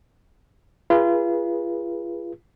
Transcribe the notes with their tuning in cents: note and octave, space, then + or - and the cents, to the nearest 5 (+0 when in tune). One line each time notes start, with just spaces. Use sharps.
F4 -35 G#4 -25 B4 -30